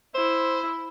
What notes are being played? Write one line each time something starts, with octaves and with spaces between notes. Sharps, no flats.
E4 C5